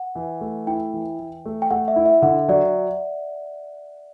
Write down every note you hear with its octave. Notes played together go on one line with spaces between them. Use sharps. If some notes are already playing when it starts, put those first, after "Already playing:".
Already playing: F#5
E3
A3
E4 G5
E3
E3
A3
G5
A3 F#5
E5
E4
E5
D3 F#5
F#3 D5